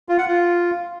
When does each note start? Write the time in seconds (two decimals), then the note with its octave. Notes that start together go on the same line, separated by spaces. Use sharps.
0.09 F4
0.18 F#5
0.28 F4